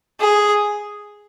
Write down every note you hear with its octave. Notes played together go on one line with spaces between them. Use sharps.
G#4